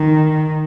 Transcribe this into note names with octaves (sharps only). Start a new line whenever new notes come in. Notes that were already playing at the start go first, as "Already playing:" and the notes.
Already playing: D#3